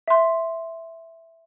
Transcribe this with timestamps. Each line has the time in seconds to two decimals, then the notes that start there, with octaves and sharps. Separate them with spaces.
0.08 E5 C6